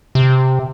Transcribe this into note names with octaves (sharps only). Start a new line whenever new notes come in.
C3